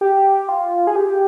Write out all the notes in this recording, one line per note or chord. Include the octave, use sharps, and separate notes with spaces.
G4
F4
G#4
G4